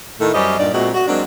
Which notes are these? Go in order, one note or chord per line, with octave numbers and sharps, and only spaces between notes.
A2 D#3 A3
F#2 G3 C#4 C5 D#5
G2 A#2 D#4 D5
A#2 G#3 A3 C4 F#4
F#4
F#3 G#3 A#3 C4 D4